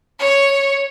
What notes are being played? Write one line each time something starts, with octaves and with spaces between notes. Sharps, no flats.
C#5